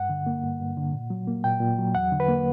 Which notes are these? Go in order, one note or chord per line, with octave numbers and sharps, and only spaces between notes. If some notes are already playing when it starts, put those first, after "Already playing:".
Already playing: G2 F#5
D3
A#3
G2
G2
D3
A#2
F#3
A#3
A#2 G5
A#2
F#3
E2 F#5
D3
B4
A#3